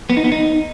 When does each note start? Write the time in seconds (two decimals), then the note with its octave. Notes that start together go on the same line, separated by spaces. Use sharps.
0.10 B3
0.17 D#4
0.24 B3
0.32 D#4